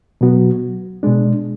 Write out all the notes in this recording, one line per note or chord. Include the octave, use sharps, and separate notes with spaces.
B2 F#3 B3 F#4
B2 G#3 D4